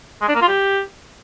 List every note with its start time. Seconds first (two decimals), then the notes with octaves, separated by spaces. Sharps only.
0.21 G#3
0.28 D4
0.35 A#3
0.42 F4
0.48 G4